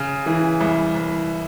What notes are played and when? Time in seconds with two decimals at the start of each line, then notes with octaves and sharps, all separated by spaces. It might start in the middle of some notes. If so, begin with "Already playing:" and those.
Already playing: C#3
0.26 E3
0.61 C2
0.95 C2